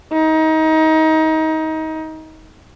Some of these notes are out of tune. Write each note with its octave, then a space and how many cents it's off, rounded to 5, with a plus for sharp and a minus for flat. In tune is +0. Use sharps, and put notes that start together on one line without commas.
D#4 +25